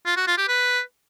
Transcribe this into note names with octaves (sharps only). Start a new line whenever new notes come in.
F4
F#4
F4
G4
B4